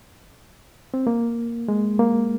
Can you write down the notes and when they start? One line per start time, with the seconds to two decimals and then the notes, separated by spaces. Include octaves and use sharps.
0.94 C4
1.07 A#3
1.68 G#3
1.99 A#3